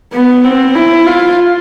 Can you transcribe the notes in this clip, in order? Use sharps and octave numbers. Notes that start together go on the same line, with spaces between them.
B3
C4
E4
F4